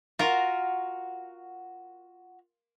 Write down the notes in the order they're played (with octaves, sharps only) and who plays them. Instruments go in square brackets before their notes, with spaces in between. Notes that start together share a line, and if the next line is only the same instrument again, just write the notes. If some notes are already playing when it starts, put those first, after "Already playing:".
[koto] F4 A#4 [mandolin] F#4